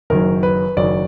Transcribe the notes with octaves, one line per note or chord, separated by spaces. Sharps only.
F#1 F#2 D#3 F#3 A#4
B4
F#1 F#2 D#3 F#3 D5